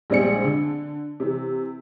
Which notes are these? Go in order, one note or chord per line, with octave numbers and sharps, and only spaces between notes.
A#1 G3 G#3 C4 G#4 C#7
D3
C3 E3